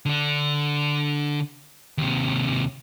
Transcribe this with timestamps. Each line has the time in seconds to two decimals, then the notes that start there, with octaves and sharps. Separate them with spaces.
0.06 D3 D4
1.98 D#2 C3